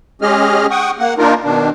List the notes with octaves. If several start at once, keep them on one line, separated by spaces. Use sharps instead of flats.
G#3 C#4 G4 G#4 D#5 F6
F#5 G5 C#6 D#6
A#3 F#5
A#3 D4 D#4 F4 A#4
B2 D#3 D4